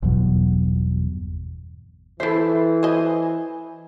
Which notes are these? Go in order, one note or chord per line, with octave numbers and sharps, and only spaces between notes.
G1 E2 B2 F#3
E3 E4 A4 C5 E5
C5 D#5 G#5